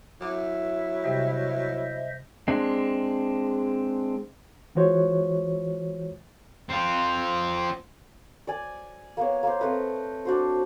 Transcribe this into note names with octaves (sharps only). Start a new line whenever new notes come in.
F#3 E4 D6
C3 G3 G4 C5 D#5 E5
G#3 C4 D4
E3 G#3 F4 F#4 C5 C#5
C4 F4
D5 G#5
A#3 B3 C#5
A#3 C5
A3 C4 B4 D#5
D4 F#4 C5